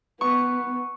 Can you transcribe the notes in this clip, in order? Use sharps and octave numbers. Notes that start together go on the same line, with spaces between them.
B3 B4 C#6